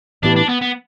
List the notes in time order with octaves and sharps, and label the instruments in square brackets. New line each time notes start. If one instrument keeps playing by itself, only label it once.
[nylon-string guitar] A2 E3 B3 E4 G4 [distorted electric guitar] D4
[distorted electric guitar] D4
B3
B3